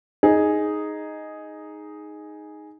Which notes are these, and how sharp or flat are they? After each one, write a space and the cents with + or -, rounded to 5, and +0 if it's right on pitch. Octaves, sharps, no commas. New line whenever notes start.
D#4 +0 G#4 +0